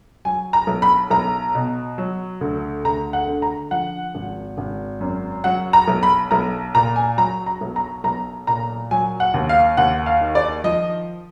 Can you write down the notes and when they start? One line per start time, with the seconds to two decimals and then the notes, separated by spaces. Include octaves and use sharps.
0.25 F#3 G#5
0.53 A#5
0.67 B1
0.82 B5
1.11 B1 A#5
1.55 B2
1.98 F#3
2.41 D2
2.85 D2 A#5
3.13 F#5
3.27 D3
3.42 A#5
3.71 F3 F#5
4.15 G#1
4.58 G#1
5.01 F#2
5.44 F#3 F#5
5.73 A#5
5.88 B1
6.03 B5
6.31 B1 A#5
6.75 A#2 A#5
6.96 G#5
7.17 F#3 A#5
7.46 A#5
7.61 B1
7.76 A#5
8.04 B1 A#5
8.47 A#2 A#5
8.91 F#3 G#5
9.20 F#5
9.34 D#2
9.49 F5
9.77 D#2 F#5
10.06 F5
10.21 D#3
10.35 D5
10.64 F3 D#5